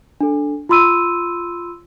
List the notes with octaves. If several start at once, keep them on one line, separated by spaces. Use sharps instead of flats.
D4 A4
F4 B5 C6 E6 D#7